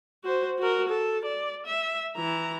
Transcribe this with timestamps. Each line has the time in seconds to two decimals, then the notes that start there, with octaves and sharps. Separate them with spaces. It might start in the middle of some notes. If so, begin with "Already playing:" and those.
0.24 F#4 C5
0.59 F#4 A#4
0.89 A4
1.25 D5
1.66 E5
2.16 E3 A#5